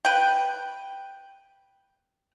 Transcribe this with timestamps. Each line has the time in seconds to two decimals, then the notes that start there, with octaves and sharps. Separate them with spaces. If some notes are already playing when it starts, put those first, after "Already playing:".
0.05 B4 G5